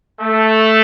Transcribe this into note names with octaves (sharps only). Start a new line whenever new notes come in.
A3